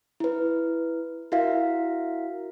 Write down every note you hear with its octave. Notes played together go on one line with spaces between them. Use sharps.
E4 B4
E4 F#4 A#4 E5 F5